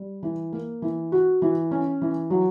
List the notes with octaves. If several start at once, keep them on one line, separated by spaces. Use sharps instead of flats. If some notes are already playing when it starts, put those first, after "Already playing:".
Already playing: G3
E3
A#3
E3
F#4
E3
C#4
E3
F#3